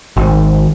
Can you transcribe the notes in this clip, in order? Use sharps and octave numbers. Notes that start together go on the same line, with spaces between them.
G#1